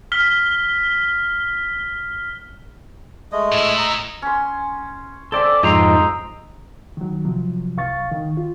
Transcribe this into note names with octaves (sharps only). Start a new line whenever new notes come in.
F6 B6 G7
G#3 A3 D#5
A2 E4
D#5 A#5
C#4 C6
C4 A4 D5 E5
F2 G#2 D#4 D#5 G5 A#5 C6 E6
D#3 F#3
C3 F3 F#3
C2 F5 C#6 A6
D#3
F4